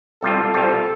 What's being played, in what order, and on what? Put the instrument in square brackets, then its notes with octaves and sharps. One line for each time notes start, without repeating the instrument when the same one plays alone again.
[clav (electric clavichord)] C2 C3 G3 F4 [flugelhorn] A4
[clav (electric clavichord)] C2 C3 G3 F4